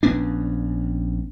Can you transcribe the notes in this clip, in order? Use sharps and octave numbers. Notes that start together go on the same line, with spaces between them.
A#1 B3 C#4 D4